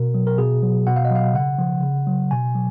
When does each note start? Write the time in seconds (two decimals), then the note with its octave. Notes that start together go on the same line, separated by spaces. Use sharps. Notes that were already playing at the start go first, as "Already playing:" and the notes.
Already playing: B2 A#4
0.15 F#3
0.27 A#4
0.38 B2 G#4
0.63 F#3
0.87 B2 F#5
0.96 F5
1.05 D#5
1.10 F#3
1.15 F5
1.34 C#3 F#5
1.59 F3
1.83 C#3
2.07 F#3
2.31 B2 G#5
2.55 F#3